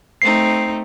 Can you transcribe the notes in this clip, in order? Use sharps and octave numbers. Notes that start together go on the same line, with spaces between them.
A3 C4 D#4 C7